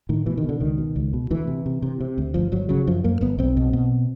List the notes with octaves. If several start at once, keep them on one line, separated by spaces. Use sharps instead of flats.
A2 D#3
B2 E3
D#3
B2 D3
C#2 D#3
B2
C#2
B2
D2 E3
C3
C3
C3
C3
D2
G1 F3
G1 F#3
C#3 F#3
F#2 F3
F#2 A#3
G1 B3
B1 C4
B2
B2